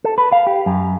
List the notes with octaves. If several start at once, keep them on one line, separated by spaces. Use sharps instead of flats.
A4
B4
F5
G4
F#2